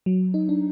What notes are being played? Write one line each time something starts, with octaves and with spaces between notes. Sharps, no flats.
F#3
D#4
D4